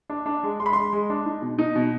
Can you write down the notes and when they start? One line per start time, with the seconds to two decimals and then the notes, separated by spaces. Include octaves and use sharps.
0.10 D4
0.26 D4
0.43 G#3
0.60 G#3 C6
0.66 B5
0.73 G#3 C6
0.93 G#3
1.10 D4
1.26 D#4
1.42 B2
1.58 D#4
1.76 B2